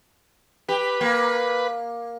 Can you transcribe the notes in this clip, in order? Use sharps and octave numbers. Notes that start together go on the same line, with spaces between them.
G4 B4
A#3